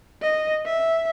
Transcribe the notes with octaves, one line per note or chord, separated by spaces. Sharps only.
D#5
E5